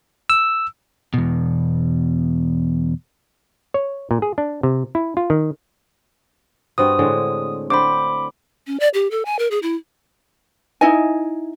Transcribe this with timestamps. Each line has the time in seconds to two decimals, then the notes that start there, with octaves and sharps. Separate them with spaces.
0.30 E6
1.14 E2 B2
3.74 C#5
4.11 A#2
4.22 G#4
4.38 D4
4.63 C3
4.95 E4
5.17 F4
5.30 D#3
6.78 G2 C4 F#4 D#6
6.99 A2 D3 G#3
7.70 D3 C5 G5 B5 D6
8.67 C#4
8.80 D5
8.94 G4
9.11 A4
9.25 G#5
9.39 A#4
9.51 G#4
9.63 E4
10.81 D#4 E4 D#5 G#5